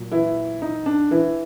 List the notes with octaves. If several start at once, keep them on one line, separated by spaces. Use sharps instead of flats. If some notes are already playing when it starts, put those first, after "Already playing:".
Already playing: A#2 F#3
E3 E4
D#4
D4
E3 E4